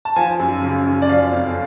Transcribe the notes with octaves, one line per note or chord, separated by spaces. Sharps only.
A5
F3 G#5
F#2
C#3
F#2
D5
F3 F5
F2